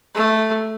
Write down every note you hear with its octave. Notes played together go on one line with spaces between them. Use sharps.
A3